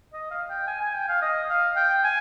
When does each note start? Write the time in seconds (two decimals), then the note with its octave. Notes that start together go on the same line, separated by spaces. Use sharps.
0.13 D#5
0.31 F5
0.50 G5
0.67 G#5
0.81 G#5
0.94 G5
1.09 F5
1.22 D#5
1.50 F5
1.76 G5
2.04 G#5